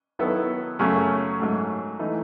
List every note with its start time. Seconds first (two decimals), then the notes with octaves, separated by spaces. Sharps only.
0.19 D#3 F#3 B3 E4 A4
0.79 F#2 C#3 F#3 A3
1.40 G#2 F#3 A3
1.99 E3 A3 D#4